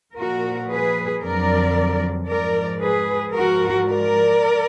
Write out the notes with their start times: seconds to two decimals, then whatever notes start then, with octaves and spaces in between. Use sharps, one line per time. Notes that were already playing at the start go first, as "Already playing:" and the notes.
0.18 A#2 F3 F#4 A#4
0.71 G#4 B4
1.23 F2 D3 F#3 A#4 D5
2.28 G#2 F3 A#4 D5
2.81 G#4 B4
3.33 G#2 F3 F#4 A#4
3.86 A#4 D5